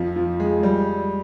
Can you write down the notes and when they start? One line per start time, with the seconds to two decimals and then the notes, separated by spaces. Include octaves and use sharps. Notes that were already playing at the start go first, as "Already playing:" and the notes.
Already playing: F2 F3
0.16 F3
0.40 G#3
0.63 G3